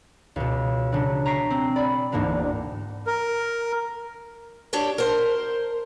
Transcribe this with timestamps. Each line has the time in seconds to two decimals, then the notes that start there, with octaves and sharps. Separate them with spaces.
0.36 C#2 B2
0.92 C#3 F#3 D4 F#4
1.25 G#5 A#5 C#6 B6 C7 D7
1.50 C4
1.76 D5 B5
2.12 E1 D2 G#2 B2 A#3 D4
3.07 A#4
4.73 D4 G4 C#5 D5
4.98 A#4 C5